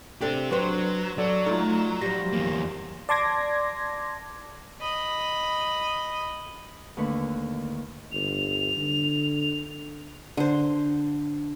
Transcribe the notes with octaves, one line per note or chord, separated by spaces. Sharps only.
C4 D4 G4 A4
F#3 D4 B4 C5
F#3 A4 D5
A3 D#4 F4
F3 G3 A#6
E2 A#3
D5 A5 C6 D6 G#6 A#6
D#5 B5
D#2 D3 A3 B4 C#6
G1 F7
D3
D3 C5